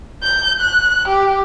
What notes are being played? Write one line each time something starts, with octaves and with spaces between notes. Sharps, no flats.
G6
F#6
G4